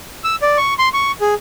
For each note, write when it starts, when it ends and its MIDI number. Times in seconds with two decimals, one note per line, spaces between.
0.24 0.36 88
0.42 0.57 74
0.57 0.74 85
0.79 0.89 84
0.94 1.12 85
1.21 1.34 68